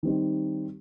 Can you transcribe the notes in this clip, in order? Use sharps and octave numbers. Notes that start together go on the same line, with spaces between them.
D#3 G3 C4 D#4